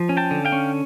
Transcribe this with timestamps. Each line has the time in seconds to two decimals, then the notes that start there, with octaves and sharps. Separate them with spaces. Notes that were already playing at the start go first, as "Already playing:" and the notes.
Already playing: F3
0.09 C#4
0.17 G5 A5
0.31 D3
0.45 F5 G5
0.52 C#4